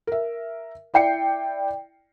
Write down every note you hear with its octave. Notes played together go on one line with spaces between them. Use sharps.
A#4 E5
E4 D5 G5 C7 C#7